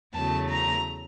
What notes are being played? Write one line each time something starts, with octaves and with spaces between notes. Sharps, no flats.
E2 C#3 F#3 A3 A5
A#5